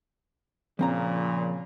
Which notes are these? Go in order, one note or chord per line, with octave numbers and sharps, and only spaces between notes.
A#2 C#3 F3 C4 A#5